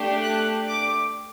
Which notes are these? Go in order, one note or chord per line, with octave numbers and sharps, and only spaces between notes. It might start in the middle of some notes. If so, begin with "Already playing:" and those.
Already playing: A3 D4 G4
F#6
D6